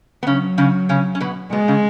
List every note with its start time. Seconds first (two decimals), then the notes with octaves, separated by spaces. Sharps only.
0.23 B3
0.27 C#3 F#3 C#4
0.58 C#3 C#4
0.89 C#3 C#4
1.15 C#4
1.20 B2 B3
1.52 B2 G#3 B3
1.68 C#3 C#4